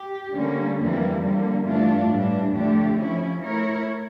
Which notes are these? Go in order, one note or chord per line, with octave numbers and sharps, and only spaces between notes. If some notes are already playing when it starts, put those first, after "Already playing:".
Already playing: G4
D3 G3 A#3 C#4
F2 E3 G3 A#3
D3 G3 A#3
G2 E3 A3 D4 F4
A2 E3 G3 D4
F2 D3 A3 D4 G4
F3 C#4 E4
A3 E4 A#4 C#5